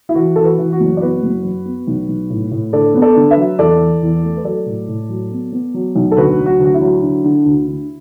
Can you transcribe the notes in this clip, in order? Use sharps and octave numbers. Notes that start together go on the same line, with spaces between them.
E4
E3 F#4
E3 A4
F#4 B4
E3
F#4
F#1
D5
B3 F#4 B4
F#1
F#2
B3
B1
B1
A2
A2
D3 A4 D5
B3
A4 D5
D3
B4 E5
F#3
E2 A4 D5
E3
E2
A3
B4
F#3 A4 D5
A2
A2
F#3
B3
B3
F#3
B1
A4
D2 F#4 B4
F#3
F#4
D2
F#4
E4
F#3
D3
D3
D2
D3